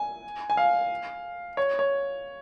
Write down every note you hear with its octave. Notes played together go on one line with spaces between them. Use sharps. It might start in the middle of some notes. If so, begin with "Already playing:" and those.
Already playing: G#5
G#5
F5
C#5
C#5